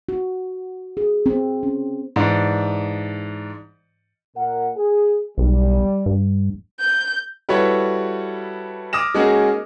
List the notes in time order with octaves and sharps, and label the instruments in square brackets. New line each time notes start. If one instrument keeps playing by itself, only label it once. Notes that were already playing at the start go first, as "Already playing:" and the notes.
[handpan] F#4
G#4
C4
C#4
[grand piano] G#2 E3 D4 D5
[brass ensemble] A#2 A#4 F#5
G#4
[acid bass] B1 [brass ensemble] G3
[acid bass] G2
[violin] G6
[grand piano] G3 E4 F#4 A4 B4 C#5
D6 D#6 F6 A#6 E7
G#3 A#3 C#4 D#4 F#4 G#4